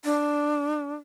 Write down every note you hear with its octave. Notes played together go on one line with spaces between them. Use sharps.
D4